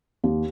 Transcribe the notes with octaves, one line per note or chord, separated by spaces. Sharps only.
D#2